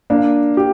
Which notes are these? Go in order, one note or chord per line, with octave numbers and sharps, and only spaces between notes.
A#3 D4
G4